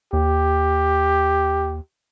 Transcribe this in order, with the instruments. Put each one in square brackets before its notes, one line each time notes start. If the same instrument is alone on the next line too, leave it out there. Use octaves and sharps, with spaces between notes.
[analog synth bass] D#2 [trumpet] G4